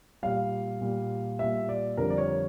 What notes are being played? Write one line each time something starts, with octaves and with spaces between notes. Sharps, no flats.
A#2 G3 F5
A#2 G3
A#2 G3 E5
D5
F2 D3 G3 A#4
D5
C#5